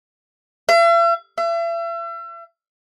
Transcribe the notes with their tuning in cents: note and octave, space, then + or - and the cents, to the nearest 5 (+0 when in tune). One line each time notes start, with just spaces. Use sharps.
E5 +45
E5 +40